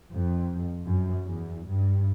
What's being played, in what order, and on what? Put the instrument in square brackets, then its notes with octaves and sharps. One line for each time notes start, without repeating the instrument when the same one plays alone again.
[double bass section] F2
F#2
E2
G2